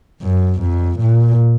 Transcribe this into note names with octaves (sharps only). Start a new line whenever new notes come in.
F#2
F2
A#2